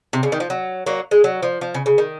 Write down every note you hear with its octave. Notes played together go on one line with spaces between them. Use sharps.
C3
C#3
D#3
F3
F#3
F#3 A#3
G#3
F#3
F3
F3
C#3
C#3
D#3